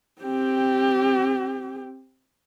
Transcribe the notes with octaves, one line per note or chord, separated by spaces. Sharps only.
C4 G4